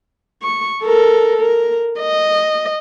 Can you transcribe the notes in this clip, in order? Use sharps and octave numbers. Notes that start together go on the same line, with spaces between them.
C#6
A4 A#4
A#4
D#5